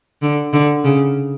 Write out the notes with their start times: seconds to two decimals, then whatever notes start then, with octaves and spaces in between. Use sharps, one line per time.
0.22 D3
0.53 D3
0.84 C#3